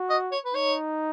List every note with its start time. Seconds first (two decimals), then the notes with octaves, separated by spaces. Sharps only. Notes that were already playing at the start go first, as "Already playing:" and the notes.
Already playing: F#4
0.10 D#5
0.32 C#5
0.45 B4
0.54 D#4 C#5